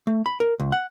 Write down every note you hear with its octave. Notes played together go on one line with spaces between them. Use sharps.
A3
B5
A#4
C#2
F#5